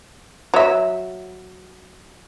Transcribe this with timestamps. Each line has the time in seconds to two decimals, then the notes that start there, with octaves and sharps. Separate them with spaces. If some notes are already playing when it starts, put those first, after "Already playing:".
0.54 F#3 E5